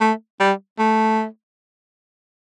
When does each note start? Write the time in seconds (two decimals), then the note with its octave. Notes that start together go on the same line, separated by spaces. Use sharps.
0.01 A3
0.40 G3
0.79 A3